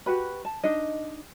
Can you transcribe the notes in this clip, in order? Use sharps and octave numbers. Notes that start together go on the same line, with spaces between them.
F#4 G4 B4 B5
A5
D4 D#4 D#5